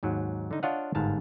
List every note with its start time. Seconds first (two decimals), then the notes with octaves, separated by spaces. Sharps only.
0.03 D#2 G#2 F#3
0.51 D3 D#4
0.63 D4 F4 C#5 D#5 F5 F#5
0.95 G1 G#2 F5 A5